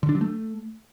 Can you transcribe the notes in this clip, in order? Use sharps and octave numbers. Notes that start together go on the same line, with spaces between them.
D3
D4
F#3
A3